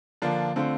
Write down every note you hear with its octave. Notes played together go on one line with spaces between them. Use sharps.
D3 F3 A#3 D4 F4
D3 A3 C4 F4